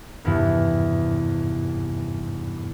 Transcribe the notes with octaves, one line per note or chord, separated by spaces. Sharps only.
G#1 E2 G2 C3 B3 E4